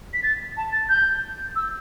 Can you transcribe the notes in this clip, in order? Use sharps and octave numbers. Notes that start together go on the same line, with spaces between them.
B6
A6
A5
A6
G6
E6